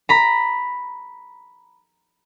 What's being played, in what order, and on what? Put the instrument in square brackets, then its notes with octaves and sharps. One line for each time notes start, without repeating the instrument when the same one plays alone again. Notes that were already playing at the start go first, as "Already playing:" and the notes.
[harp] A#5 B5